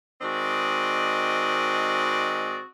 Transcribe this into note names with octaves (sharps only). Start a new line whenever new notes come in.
D#3 G#3 C4 F#4 D5 D#5